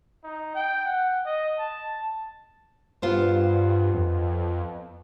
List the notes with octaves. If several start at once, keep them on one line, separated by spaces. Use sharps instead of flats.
D#4
G5
F#5
D#5
A5
G2 B3 F4 C5
F2